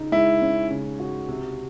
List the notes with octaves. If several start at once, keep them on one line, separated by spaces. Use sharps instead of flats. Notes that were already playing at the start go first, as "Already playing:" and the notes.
Already playing: C#3 D#4
G#3 E4
C#4
C#3
F#4
C3